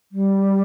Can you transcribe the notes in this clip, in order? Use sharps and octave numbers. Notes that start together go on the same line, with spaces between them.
G3